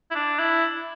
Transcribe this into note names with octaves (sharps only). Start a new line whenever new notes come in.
E4
D4
E4